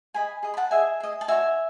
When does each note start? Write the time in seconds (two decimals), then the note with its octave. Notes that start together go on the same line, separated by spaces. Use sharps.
0.14 G#4 D#5 G#5 B5
0.43 G#4 D#5
0.54 B5
0.57 F#5 A5
0.71 G#4 D#5 E5 G#5
1.00 G#4 D#5
1.21 A5
1.28 D#4 F#4 C#5 E5 G#5